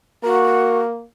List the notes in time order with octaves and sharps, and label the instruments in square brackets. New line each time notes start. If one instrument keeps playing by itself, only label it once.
[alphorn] A#3 [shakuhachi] F#4 [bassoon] A#4